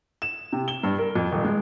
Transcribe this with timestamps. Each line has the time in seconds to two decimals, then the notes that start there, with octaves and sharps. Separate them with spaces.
0.22 E7
0.53 C3
0.68 G7
0.83 G2
0.98 A#4
1.16 F2
1.32 D#1
1.44 G#3